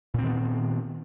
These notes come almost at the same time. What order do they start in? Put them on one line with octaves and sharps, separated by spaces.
A#2 C4 D#3 B3